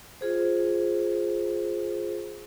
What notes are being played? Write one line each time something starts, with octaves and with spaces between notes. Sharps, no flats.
F4 G#4 C5